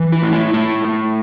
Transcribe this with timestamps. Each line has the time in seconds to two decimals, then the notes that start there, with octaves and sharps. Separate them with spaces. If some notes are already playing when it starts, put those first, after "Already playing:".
Already playing: E3
0.12 E4
0.22 A2
0.33 E4
0.54 A2 E4
0.85 A2